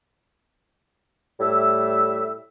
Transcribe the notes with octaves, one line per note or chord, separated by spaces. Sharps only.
A2 G3 E5